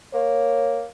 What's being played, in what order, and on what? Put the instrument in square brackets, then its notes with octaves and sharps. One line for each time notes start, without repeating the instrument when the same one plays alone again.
[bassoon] A#3 [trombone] C#5